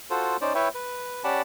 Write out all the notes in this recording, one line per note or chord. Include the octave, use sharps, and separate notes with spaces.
F4 F#4 A4 C5
C#4 D#4 C5 D5
E4 B4 C#5 E5 G5
B4
C#4 G4 D5 F#5 A5 B5